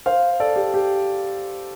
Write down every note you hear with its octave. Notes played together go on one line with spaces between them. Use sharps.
C5 F5
A4 D5
G4
G4